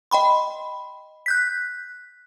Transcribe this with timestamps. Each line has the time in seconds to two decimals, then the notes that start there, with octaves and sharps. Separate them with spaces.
0.11 D#5 G5 B5 C6
1.26 F#6 G6 B6